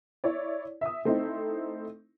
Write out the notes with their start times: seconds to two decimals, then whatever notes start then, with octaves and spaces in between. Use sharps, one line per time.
0.24 E4 C#5 D5
0.81 E5 D#6
1.05 A3 C4 D#4 E4